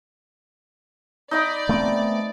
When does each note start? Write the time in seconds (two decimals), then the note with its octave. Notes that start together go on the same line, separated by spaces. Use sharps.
1.31 D#4 D5 D#5 B5
1.69 A3 B3 C4